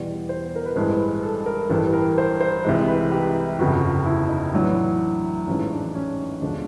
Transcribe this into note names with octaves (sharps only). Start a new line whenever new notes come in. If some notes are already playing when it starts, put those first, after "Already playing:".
Already playing: E2 B2 G3 D5
C5
A#4
B4
A1 G2 E3 G#3 C5
A4
A#4
A1 G2 E3 G3 A4
A#4
C5
C5
C2 C3 E3 G#3
B4
G4
G1 F2 C#3 F#4
E4
D#4
A1 A2 F#3 D4
A1 G#2 F3 G#3 C#4
D4
C#4
E1 D2 D3 F3 G#3 D4